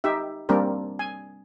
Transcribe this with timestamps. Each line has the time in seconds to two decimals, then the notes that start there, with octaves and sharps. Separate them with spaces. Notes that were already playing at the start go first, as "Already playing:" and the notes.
0.04 D#4 G4 E5
0.49 G3 A#3 C4 D4 A#4
0.99 G#5